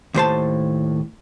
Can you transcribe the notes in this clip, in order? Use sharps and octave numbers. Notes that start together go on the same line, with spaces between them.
D#2 A2 C5 A5